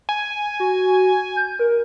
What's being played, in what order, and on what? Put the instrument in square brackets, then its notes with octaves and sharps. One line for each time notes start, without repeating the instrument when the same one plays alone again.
[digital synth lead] G#5
[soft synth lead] F#4
G6
A#4